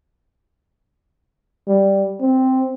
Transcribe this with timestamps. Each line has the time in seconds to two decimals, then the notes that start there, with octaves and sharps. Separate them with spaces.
1.68 G3
2.21 C4